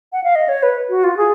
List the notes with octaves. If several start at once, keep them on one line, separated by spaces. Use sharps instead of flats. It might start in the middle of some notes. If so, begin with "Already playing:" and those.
F#5
F5
D#5
C#5
B4
F#4
F4
G#4